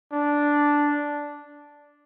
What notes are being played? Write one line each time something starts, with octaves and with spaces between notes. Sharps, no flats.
D4